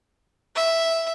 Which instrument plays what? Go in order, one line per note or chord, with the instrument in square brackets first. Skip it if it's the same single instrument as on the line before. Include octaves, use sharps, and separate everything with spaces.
[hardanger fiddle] E5